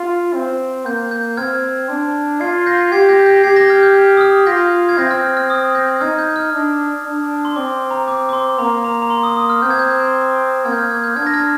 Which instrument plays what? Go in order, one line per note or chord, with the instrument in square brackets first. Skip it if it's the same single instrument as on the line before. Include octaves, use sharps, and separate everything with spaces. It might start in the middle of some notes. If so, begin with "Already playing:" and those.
Already playing: [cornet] F4
C4
[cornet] A#3 [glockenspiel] G6
[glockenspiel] G6
[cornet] C4 [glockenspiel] F6 G#6
[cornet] D4
[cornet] F4 [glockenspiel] G#6 C7
[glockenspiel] G6 A#6
[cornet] G4 [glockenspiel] G#6 C7
[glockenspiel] G6 A#6
G6 A#6
A#6
[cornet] G4 [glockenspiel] G#6 C7
[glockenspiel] G6 A#6
F6 G#6
G6
F6
D#6
F6
[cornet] F4 [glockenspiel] G6 A#6
[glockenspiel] G#6
[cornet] C4 [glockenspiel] G6 A#6
[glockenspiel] F6 G#6
G6
F6
D#6
G6 A#6
[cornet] D#4 [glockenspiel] F6 G#6
[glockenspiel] G6
F6
[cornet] D4
D4
[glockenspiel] C6
[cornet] C4 [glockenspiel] D6
[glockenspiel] A#5
D6
D6
C6
[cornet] A#3 [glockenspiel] A#5
[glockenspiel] A#5
A#5
C6
D#6
D#6
F6
[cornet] C4 [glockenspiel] G6
[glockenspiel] G#6
G6
[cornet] A#3 [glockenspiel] F6 G#6
[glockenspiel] G6
F6 G#6
F6 G#6
G6
[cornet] D4 [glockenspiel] F6 G#6
[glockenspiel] A#6
F6 G#6